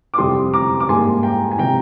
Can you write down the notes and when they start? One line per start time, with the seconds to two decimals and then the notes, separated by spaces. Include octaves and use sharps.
0.14 D6
0.18 F2 C3 G3 C6 D#6
0.54 A#5 D6
0.80 D6
0.89 G#2 G3 A#3 G#5 C6
1.23 G5 A#5
1.51 G#5
1.58 C3 F3 G5 A#5